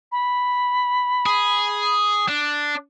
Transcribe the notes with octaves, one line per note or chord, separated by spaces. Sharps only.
B5
G#4
D4